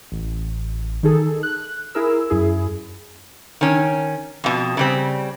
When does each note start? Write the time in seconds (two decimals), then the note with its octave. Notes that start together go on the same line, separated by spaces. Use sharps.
0.12 A1
1.03 D#3 D#4 G#4 A4
1.43 F#6
1.95 E4 G#4 A#4 E6
2.30 F#2 E4 G#4
3.61 D#3 C#4
4.44 F2 B2
4.77 C#3 G3 C4